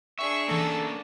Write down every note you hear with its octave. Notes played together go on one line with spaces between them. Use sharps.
D4 G#4 E5 C#6
E3 A#3 C#4 A4 E6